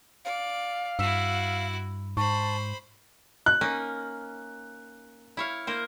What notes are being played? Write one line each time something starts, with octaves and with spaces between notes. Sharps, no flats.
D5 F5
G2 E4 F#4 E6 B6 E7
G#2 C5 A5 B5 C#6
F#6
A#3 C#4 D#4
E4 C#5 F5
A#3 A#4 C5